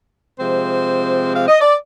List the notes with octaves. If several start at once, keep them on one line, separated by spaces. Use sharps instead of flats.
C3 F3 G#3 C4 C5
F5
D#5
D5